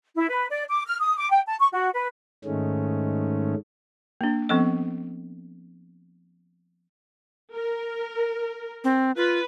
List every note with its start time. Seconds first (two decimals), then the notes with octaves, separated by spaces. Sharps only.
0.15 E4
0.29 B4
0.49 D5
0.69 D6
0.87 F6
1.00 D#6
1.17 D6
1.30 G5
1.47 A5
1.59 C#6
1.72 F#4
1.94 B4
2.45 G#2 D#3 G#3 A3 C#4
4.21 A#3 D4
4.49 F3 B3 C4 A4 D#5
7.54 A#4
8.84 C4
9.17 F4 B4